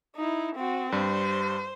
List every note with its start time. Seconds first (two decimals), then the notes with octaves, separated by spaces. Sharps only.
0.16 D#4 E4
0.56 C4 F#4
0.92 G2 G3 C5